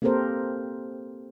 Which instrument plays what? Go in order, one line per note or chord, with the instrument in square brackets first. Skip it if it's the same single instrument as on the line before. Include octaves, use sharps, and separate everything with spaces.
[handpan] A#3 C4 G4 A4 A#4 C5